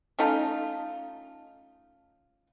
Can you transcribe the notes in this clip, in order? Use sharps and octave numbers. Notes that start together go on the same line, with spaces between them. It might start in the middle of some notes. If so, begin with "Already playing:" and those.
A3 C#4 D#4 F4